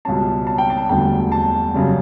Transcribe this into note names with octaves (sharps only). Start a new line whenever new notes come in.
C#2 B2 G3 C#4 A5
A5
G5
A5
E1 D2 D3 G3 G5
A5
F#2 C#3 G3